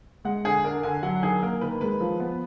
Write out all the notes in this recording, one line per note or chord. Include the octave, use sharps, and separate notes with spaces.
G#3 F#5
D3 G#4
D4 A#4
D3 G#5
F#3 F#5
D#3 G#4
A#3 A#4
D#3 B4
G#3 B4
F3
B3